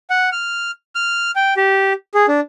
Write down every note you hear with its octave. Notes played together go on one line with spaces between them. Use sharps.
F#5
F6
F6
G5
G4
G#4
D4